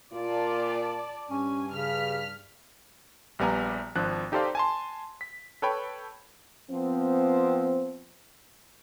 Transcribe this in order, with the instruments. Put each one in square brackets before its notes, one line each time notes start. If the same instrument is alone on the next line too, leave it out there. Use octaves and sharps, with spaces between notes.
[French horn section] A#2 F4 [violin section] D5 A5
[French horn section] G2 [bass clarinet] C#4 [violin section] G#5
[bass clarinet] C#3 [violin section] F6 B6
[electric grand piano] A#1 G3 B3 G#5 A#5
G#1 F3 D4 F#6
D#4 G4 A4 C5 D5 F5
G#5 A5 C6
B6
A4 B4 C#5 G5 B5
[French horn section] F3 B3 C4